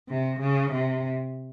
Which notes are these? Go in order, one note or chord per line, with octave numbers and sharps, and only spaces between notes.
C3
C#3
C3